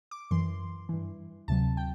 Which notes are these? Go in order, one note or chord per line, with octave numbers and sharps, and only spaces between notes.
D6
F#2 E3 C6
G2 E3
D2 C3 F#3 A5
G5